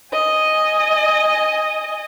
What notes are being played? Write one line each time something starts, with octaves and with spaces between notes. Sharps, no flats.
D#5 G#5